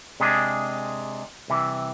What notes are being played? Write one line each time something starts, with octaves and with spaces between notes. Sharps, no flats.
C3 G#3 D4 G#4
C2 C3 E3